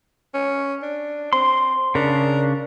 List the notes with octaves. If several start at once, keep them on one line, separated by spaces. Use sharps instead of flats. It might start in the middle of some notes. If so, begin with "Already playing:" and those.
C#4
D4
C4 C6
C#3 D4 A#4